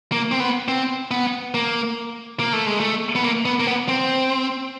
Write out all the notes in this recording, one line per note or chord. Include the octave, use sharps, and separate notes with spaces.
A#3
C4
B3
C4
B3
A#3
A#3
A3
G#3
A3
B3
A#3
B3
A#3
B3
C4